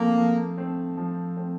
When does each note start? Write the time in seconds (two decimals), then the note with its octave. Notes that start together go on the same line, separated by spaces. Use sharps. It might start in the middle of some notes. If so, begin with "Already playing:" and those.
Already playing: F3 A3 A#3 C4
0.17 F3
0.57 A3 C4
0.97 F3
1.37 A3 C4